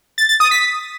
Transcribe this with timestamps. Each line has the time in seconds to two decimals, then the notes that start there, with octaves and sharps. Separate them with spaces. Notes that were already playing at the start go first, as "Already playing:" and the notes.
0.18 A6
0.29 A6
0.40 D#6
0.51 B6